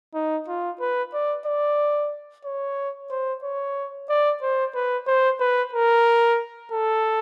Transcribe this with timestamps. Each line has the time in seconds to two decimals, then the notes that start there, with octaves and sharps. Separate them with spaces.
0.14 D#4
0.48 F4
0.80 B4
1.13 D5
1.46 D5
2.45 C#5
3.10 C5
3.43 C#5
4.09 D5
4.42 C5
4.75 B4
5.07 C5
5.40 B4
5.73 A#4
6.72 A4